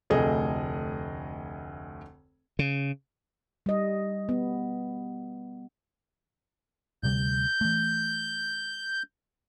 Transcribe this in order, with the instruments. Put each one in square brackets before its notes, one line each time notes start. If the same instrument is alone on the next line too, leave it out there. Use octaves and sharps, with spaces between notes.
[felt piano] F1 D2 A3 G#4 D#5
[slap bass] C#3
[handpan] G3 D#5
B3
[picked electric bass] D2 C3 G3 [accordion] G6
[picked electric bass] E3 A3